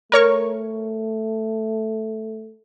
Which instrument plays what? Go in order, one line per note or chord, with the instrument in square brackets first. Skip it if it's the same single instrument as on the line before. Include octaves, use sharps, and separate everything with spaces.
[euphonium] A3 [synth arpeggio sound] A#4 C#5 C#6